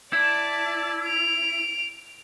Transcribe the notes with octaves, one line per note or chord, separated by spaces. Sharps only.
E4 D5 A5
D7 F7